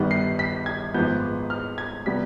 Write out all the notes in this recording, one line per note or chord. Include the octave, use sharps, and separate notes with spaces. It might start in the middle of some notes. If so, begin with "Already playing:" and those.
Already playing: G1 G2 D#3 G3 B3
C7
B6
G#6
G#1 G#2 F3 G#3 B3 G6
F6
G#6
C3 G3 B3 B6